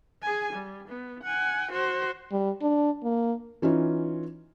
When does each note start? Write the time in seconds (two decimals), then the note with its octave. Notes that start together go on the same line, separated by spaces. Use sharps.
0.22 G#4 G#5
0.53 G3
0.88 B3
1.24 F#5 G#5
1.72 F#4 C5
2.32 G3
2.62 D4
3.03 A#3
3.62 E3 C#4 D#4 F4